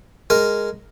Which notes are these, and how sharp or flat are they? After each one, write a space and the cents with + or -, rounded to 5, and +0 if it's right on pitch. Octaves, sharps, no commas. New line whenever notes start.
G#3 +0 A#4 -5